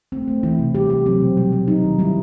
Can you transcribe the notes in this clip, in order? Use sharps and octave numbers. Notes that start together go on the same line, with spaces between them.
A3 C4
A3
E3 E4
C3
G3 G4
G3 G4
F#3 C4
B2
G3
G3
F#3 D#4
D#3
G3 E4